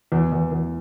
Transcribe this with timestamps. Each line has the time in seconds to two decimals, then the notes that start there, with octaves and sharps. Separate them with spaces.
0.12 E2
0.32 E2
0.52 E2